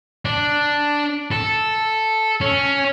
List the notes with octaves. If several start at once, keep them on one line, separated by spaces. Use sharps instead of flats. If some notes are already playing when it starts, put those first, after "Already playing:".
D4
A4
C#4